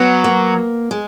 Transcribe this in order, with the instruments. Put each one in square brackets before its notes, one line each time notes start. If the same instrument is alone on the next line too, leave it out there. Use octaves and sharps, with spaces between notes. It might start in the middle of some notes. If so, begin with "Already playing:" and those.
Already playing: [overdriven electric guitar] F#3 [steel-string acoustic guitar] B3
[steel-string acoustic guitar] A#3
G#3